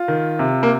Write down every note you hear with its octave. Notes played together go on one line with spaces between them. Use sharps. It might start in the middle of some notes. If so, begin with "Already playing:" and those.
Already playing: F4
D#3
C3
A#3